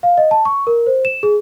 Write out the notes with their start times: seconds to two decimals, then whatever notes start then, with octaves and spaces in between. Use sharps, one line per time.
0.03 F5
0.18 D#5
0.31 A5
0.45 C#6
0.67 A#4
0.87 C5
1.05 E7
1.23 G#4